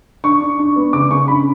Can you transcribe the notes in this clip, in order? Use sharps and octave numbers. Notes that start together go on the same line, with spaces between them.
D4 C#6
D4
D4
B3
C#3 D6
C#3 C#6
D4 B5